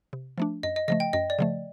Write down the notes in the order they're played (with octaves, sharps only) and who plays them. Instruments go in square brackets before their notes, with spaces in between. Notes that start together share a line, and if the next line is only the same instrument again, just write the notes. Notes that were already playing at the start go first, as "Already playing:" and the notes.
[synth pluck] C3
F3 A3 D4
[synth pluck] F#2 [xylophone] D#5
[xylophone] D#5
[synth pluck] C#3 F3 A3 [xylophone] D#5
[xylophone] G5
[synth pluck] F#2 [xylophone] D#5
[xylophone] D5
[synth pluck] C#3 F3 A3